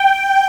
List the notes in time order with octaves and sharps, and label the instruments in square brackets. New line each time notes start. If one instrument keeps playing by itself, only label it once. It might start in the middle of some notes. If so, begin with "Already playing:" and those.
Already playing: [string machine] G5